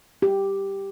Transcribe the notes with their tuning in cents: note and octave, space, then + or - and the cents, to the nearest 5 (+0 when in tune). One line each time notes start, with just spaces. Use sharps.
G4 +0